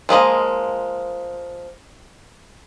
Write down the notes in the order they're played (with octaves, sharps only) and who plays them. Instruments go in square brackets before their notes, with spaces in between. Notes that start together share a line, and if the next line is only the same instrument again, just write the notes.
[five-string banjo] F3 G#3 A#3 D#5